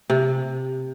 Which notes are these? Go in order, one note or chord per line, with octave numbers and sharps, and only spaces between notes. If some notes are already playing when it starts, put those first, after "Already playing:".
C3